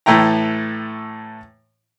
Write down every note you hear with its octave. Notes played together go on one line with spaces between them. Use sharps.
A2 E3 A3 E4 G5 A#5